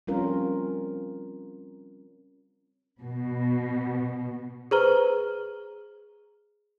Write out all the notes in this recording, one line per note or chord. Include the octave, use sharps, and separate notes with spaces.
G3 C4 C#4 F4 A#4
B2
G#4 B4 C5 A#5 F6 G7